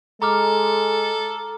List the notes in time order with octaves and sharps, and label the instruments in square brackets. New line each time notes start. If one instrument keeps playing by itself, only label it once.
[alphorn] G#3 [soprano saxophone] A4 [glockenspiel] A#5 D6 F6